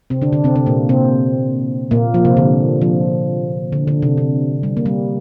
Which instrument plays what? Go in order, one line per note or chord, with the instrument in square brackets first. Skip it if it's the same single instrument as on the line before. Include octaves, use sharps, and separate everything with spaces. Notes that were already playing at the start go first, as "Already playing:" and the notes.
[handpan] C3 C4
D3 D4
D3 D4
C3 C4
C3 C4
A#2 A#3
C3 C4
A#2 A#3
F3
C3
D3
F3
D3
D3
C3
C3
G3
A#3
G3